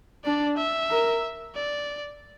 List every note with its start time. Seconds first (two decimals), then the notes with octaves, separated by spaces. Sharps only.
0.24 D4 D5
0.57 E5
0.90 A#4
1.55 D5